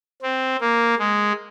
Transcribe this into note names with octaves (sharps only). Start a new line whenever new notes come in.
C4
A#3
G#3